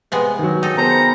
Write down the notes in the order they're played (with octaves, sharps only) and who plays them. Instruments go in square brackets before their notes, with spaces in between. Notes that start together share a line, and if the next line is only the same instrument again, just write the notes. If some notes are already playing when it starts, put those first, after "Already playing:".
[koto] C3 G#3 B3
[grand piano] D#3 F#3
[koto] D#4 A4 [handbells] G5 G#5
[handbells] B3 G#4 A#4 [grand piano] C5 A5 [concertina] A#5
[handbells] G5 B5 C#7